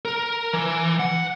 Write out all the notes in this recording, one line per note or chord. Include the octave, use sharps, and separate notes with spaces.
A#4
E3
F#5